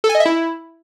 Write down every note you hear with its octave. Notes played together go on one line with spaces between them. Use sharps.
A4
G#5
D#5
E5
E4